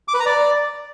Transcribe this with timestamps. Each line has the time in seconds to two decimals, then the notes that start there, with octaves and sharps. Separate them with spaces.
0.08 D6
0.14 B4
0.20 A#5
0.26 D5